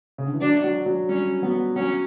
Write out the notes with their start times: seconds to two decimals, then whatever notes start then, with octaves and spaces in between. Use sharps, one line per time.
0.18 C#3
0.26 D3
0.34 E3
0.41 F#3 D4
0.64 F#3
0.86 F#3
1.09 G3 C#4
1.43 F#3 B3
1.76 F#3 C#4